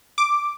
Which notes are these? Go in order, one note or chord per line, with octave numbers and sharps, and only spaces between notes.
D6